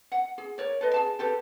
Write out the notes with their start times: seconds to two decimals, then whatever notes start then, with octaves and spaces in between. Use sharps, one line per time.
0.12 F#5
0.38 G#4
0.58 A#4 C#5 D5
0.81 A4 B4 D#5
0.94 G#4 A5
1.19 G4 A4 B4